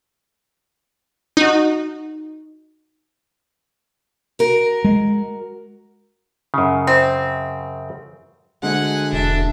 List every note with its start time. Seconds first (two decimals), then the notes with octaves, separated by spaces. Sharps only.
1.37 D#4 F#4
4.39 F#4 A#4
4.84 G#3
6.54 F#2 C#3
6.87 C4
8.62 D2 D3 G#3 F#5 G#5
9.13 E1 D4 E5